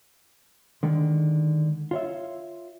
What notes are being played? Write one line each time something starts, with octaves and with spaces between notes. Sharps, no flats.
D3 D#3 G#3
F4 C#5 E5